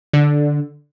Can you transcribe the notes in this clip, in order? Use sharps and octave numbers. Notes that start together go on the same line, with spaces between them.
D3